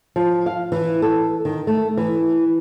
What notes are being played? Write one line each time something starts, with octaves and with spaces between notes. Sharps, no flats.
F3
F5
E3
A4
D#3
A3
E3